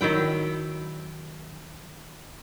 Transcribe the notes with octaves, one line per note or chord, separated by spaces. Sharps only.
D#3 F#3 E4 G5